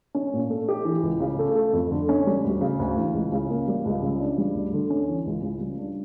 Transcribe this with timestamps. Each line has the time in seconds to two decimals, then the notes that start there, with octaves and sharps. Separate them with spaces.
0.15 C#4
0.33 A#2
0.50 A3
0.69 G4
0.85 E3
1.03 C#2
1.20 C#3
1.39 A3
1.55 A3
1.73 F2
1.91 D3
2.09 C#4
2.27 G3
2.45 D2
2.61 C#3
2.79 D2
2.97 E3
3.14 C#2
3.32 C#3
3.50 A#3
3.68 G3
3.85 C#2
4.02 C#3
4.20 D4
4.38 G3
4.55 D2
4.73 D3
4.90 C#4
5.09 E3
5.26 C#2
5.43 C#3
5.60 G3
5.79 D4